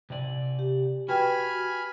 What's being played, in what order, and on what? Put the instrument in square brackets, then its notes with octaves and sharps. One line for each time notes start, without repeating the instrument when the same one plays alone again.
[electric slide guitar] C3 D5
[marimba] G4
[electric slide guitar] F#4 [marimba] B4 G5 [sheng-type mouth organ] G#5 B5 F6